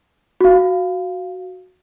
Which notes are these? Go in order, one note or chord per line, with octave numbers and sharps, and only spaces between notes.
F#4 F5